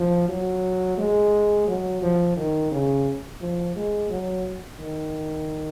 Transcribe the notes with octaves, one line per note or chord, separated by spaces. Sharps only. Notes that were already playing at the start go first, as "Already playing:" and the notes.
Already playing: F3
F#3
G#3
F#3
F3
D#3
C#3
F3
G#3
F#3
D#3